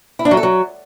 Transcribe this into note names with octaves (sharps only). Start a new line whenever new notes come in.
E4
D4
F#3
A4
F#3